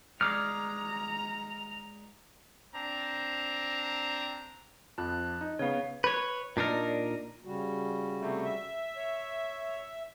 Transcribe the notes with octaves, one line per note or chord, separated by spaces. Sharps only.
G#3 D5 A#5 F6
C4 D4 A#5
F2 F3 A5 F#6
D#4
C#3 B3 C#5 F5
B4 C#5
A#2 D4 D#4 A#4
C#3 G3 F#4
C3 A3
E5
C#5